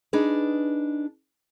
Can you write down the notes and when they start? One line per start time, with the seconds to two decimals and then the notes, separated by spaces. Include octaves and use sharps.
0.13 D4 D#4 G#4 B4